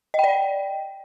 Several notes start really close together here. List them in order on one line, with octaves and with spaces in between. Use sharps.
D#5 G5 D5